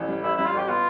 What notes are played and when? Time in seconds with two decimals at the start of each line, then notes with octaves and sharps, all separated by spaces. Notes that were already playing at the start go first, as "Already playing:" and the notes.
Already playing: A1 E3
0.09 G3
0.23 A1 E4
0.35 G3 E4
0.46 F4
0.53 A1 G4
0.68 B3 F4